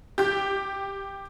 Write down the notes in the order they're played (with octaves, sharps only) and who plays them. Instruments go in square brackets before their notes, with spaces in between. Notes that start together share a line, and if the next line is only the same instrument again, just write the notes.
[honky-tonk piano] G4 G6